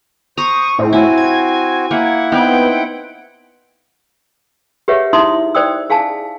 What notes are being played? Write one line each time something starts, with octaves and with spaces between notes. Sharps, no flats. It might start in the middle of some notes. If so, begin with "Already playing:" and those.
C5 A#5 C#6 D#6
A2 C4
C4 E4 F#4 G#5
G#6
A#3 E4 F#5
B3 C4 D#4 G5
G4 G#4 B4 C#5 E5 F#5
D#4 E4 E5 C6 D#6
C5 D5 G5 D#6 E6
G#4 F5 G#5 A5